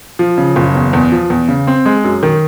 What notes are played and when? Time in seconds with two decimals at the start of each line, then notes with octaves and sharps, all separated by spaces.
0.19 F3
0.38 C#3
0.56 F#1
0.75 E2
0.93 E2
1.12 F3
1.30 E2
1.49 C#3
1.67 C4
1.86 G#3
2.04 F#2
2.23 D#3